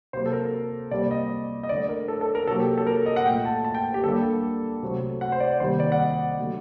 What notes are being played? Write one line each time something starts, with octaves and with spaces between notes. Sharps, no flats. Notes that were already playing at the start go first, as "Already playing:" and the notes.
C3 F#3 A#3 C5
A4
A#4
C3 G3 A#3 D5
D#5
D#5
D3 A3 D5
A#4
A4
A4
A#4
C3 F#3 A#3 A4
G4
A4
A#4
D#5
F#5
A#2 A3 G5
A5
A5
G5
G4
D3 G3 A#3 A4
C3 F#3 A3
F#5
C5
D5
C3 D#3 G3 A#3 C5
D5
F#5
D#5
D3 F#3 A3